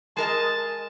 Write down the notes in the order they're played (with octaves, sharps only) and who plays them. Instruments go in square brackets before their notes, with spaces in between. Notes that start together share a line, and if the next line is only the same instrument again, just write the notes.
[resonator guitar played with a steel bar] G#3 A#4 D#5 [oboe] A5